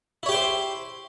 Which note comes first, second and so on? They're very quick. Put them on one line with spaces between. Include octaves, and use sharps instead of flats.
E4 C#5 G4 G5 C5